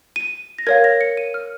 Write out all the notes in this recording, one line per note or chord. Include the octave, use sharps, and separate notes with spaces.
D#7
A#6
A#4 C#5 F5 G#6
A#6
C#7
D#7
F6